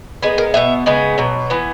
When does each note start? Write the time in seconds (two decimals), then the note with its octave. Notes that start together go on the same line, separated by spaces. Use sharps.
0.22 A#2 G#3 B3 G#4
0.38 A#4
0.54 B2 F#3 B3 E5
0.86 C#3 G#3 B3
1.18 B2 F#3
1.50 E3 B3